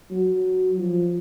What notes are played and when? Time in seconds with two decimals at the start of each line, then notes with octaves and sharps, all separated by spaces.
0.11 F#3
0.78 F3